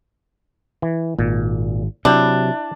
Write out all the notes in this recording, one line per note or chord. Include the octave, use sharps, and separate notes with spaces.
E3
G#1 A#2
C3 F#3 D4 E4 G5